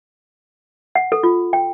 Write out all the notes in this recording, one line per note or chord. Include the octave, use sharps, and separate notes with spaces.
F#5
A4
F4
G5